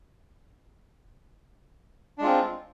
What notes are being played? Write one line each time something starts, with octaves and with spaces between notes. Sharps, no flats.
G#3 C4 D4 F4